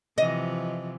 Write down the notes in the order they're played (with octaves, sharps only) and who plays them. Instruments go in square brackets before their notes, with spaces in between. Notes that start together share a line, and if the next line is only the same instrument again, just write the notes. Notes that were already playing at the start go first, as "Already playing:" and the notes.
[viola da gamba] C3 E3 F3 [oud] D#5